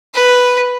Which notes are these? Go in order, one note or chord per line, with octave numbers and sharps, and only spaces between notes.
B4